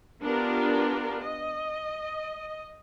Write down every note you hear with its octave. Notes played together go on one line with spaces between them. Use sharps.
B3 D4 F4 G4 A#4
D#5